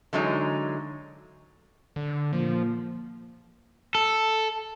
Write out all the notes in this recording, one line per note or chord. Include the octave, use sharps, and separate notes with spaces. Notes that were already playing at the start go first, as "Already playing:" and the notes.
D3 E3 F#3 G#3 D#4
D3
A#2 F3
A4